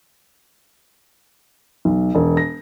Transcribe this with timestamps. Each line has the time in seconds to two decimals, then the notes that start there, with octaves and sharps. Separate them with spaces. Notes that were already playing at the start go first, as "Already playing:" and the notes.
1.85 B1
2.15 E1
2.37 A#6